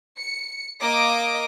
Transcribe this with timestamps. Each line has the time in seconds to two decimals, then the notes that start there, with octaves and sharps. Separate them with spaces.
0.17 C#7
0.81 A#3 D#5 D6 D#6